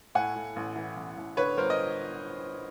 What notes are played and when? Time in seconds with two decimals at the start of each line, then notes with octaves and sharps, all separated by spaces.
0.15 A2 F#5 G#5
0.36 A2
0.56 A1
0.76 E3
0.96 A1
1.17 A1
1.37 D3 B4 C#5
1.58 G1 A#4 C5
1.70 D#5